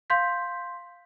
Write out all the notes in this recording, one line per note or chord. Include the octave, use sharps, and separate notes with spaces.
F5 C6 G6 B6